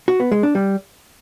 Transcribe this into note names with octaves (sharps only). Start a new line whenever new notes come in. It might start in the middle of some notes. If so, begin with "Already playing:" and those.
F#4
B3
G#3
D4
G3